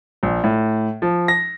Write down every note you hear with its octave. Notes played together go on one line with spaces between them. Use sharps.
A#1
A2
F3
A#6